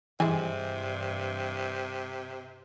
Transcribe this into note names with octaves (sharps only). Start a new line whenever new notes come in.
G2 C3 E3 G#3 G#4 G#5